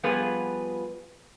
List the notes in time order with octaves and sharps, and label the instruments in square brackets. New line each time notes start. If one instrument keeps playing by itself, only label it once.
[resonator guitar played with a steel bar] F3 G3 B3 F4 G#4 B4